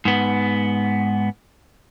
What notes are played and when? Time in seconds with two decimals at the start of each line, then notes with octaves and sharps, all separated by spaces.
0.05 G#2 B3